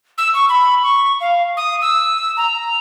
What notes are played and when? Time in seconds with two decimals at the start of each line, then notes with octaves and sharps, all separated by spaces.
0.18 E6
0.34 C#6
0.49 B5
0.83 C#6
1.21 F5
1.57 D#6
1.81 E6
2.37 A#5